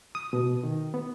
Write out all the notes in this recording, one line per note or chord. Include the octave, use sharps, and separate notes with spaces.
D#6
B2
D#3
B3